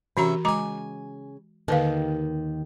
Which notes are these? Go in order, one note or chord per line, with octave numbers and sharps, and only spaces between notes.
C3 E3 C#4 F#4 E5 A#5
C#3 G#3 G#5 A#5 D6
D#2 D3 D#3 B4 F5